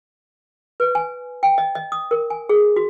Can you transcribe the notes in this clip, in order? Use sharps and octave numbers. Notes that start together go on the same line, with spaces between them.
B4
G#5
G5
D#5
D#5
D#6
A#4
G#5
G#4
F#4